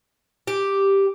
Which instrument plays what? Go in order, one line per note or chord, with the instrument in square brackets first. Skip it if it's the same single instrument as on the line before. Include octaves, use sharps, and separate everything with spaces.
[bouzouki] G4